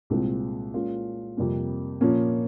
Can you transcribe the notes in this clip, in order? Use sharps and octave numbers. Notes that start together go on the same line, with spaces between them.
C2 A#2 G#3 C4 F4
A#2 G#3 C#4 F4
F2 C3 G3 A#3
A#2 F3 A#3 C#4